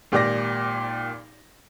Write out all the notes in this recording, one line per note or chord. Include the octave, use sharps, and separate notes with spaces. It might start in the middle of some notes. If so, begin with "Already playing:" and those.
G#1 A#2 G4 D5 D6 A#6